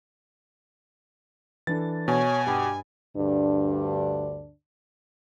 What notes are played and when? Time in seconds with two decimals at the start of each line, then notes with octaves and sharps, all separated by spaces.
1.67 E3 D4 A4 A6
2.08 B2 C#5 G#5
2.46 G2 G4 B5
3.16 D2 G2 D3 D4